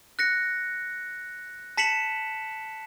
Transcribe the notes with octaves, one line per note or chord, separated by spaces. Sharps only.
F#6 A#6 C#7
A5 B6 C#7 E7 F#7